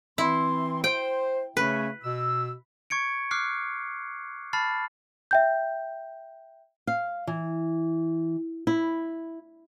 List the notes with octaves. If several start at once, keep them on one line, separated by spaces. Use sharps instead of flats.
E3 C4 E4 C6
C5 G5
C#3 A3 C#4 B4
B2 E6
C#6 G#6 C#7 D7
D6 F6 F#6 C7
A5 B5 F6 A6 C7
E5 G5 G6
F5
E3
E4